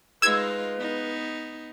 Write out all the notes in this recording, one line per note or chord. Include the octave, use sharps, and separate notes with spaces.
G#3 D#4 F4 B4 E6 G#6
B3 D#4